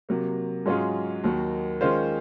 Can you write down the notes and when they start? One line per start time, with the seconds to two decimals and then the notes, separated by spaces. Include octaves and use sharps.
0.09 C3 F#3 A#3
0.66 G#2 F#3 C#4 F4 G#4
1.24 D#2 D#3 F#3
1.81 D#3 G#3 C#4 F4 C5